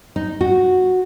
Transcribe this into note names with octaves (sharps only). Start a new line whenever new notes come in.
D#4
F#4